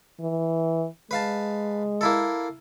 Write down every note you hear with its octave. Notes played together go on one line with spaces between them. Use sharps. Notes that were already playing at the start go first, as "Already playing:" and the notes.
E3
G#3 B4 F5 A5
A#3 E4 A4